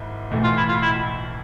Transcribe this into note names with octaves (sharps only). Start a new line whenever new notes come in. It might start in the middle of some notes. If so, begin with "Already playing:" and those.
Already playing: G#1 G#2 E4
B1 A2 E3 A3
F4
E4
F4
E4